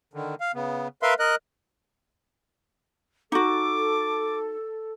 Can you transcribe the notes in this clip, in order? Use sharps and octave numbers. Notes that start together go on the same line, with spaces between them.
D3 D#3
F5
C#3 B3
A#4 B4 E5 F5 C6
A#4 D#5 F#6
D#4 F#4 A4 D6